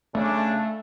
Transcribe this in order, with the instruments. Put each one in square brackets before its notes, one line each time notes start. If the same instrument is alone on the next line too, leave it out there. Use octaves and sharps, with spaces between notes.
[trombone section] C#3 D4 [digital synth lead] A3